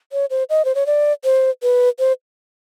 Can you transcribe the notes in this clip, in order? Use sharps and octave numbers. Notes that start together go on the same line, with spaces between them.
C#5
C5
D#5
C5
C#5
D5
C5
B4
C5